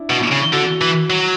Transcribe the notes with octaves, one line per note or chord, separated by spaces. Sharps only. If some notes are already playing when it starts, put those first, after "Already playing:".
Already playing: D4 E4
B2
C#3
D3 F#4
E3
F#3